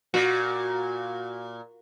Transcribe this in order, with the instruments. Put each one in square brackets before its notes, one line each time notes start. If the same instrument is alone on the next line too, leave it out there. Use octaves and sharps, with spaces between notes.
[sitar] A#2 [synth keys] F#4